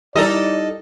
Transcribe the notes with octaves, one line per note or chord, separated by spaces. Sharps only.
G3 D#4 E4 A4 A#4 D5 D#5